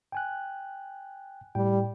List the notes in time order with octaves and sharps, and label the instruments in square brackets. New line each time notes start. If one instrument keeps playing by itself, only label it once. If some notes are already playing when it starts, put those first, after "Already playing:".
[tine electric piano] G5 G#5 F#6
[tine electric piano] A2 G5 [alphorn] G3